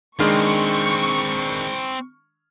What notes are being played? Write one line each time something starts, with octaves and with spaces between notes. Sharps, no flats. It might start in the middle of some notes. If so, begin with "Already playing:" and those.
D#3 G#3 C4 D4 B4 C#6 F6